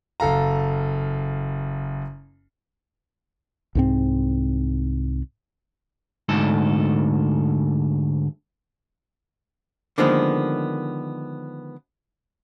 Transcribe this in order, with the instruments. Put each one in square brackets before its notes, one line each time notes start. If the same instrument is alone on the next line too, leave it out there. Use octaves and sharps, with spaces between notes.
[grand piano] F#1 A4 F5 A#5
[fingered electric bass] C2 G#2 C4
[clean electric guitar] D2 G#2 A4
[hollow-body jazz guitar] D3 D#3 F3 G#3 A#3 B3